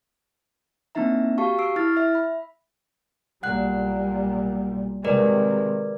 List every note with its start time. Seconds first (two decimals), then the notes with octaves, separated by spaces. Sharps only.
0.95 A#3 C4 D4 D#4 E5 A#5
1.38 F#4 G4 F5 A5 C#6
1.58 C#6 E6 C7 D7
1.76 E4 F6 A6
1.97 E5
2.15 B5
3.43 B1 A#2 G3 F#5 F#6
5.04 C3 D#3 G#3 A#4 B4 D5